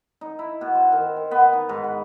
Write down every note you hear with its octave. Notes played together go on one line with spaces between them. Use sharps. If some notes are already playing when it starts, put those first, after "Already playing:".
D#4
E4
B2
C5
D#3
D#3
B3
D#4
G#2
B4